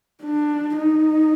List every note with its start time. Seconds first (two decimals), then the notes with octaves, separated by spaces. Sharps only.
0.24 D4
0.77 D#4